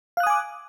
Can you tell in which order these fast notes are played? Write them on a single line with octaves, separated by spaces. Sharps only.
F5 F#6 D#6 G#5 D6